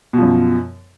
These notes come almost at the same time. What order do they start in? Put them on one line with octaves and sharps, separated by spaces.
B2 F3 F#2